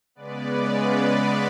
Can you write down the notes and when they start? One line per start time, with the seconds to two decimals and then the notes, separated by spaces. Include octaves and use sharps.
0.15 C#3 G#3 B3 B4 D5
0.68 B4 D5